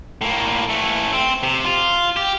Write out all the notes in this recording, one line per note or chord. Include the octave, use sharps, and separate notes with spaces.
A2 A#3
E3 A3
C4
C3
F4
G4